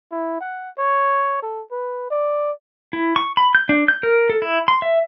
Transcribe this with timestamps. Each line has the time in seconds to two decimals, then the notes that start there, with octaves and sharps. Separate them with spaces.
0.11 E4
0.40 F#5
0.78 C#5
1.43 A4
1.71 B4
2.11 D5
2.93 E4
3.16 C#6
3.37 B5
3.55 G6
3.69 D4
3.88 G6
4.03 A#4
4.30 A4
4.42 E4
4.68 C6
4.82 E5